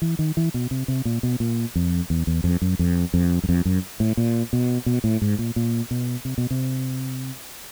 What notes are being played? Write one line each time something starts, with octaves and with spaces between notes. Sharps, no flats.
E3
D#3
E3
B2
C3
C3
A#2
B2
A#2
F2
E2
E2
F2
F#2
F2
F2
F#2
F2
F#2
A2
A#2
B2
B2
A2
G#2
A#2
A#2
B2
C3
B2
C3